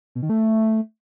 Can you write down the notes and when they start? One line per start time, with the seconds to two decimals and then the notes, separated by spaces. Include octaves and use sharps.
0.15 B2
0.22 D#3
0.30 A3